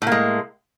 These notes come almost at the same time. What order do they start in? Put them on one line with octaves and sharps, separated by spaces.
A2 A#3 G#3